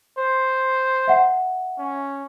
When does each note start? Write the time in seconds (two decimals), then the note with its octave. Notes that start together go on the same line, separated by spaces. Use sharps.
0.18 C5
1.08 E5 F#5
1.78 C#4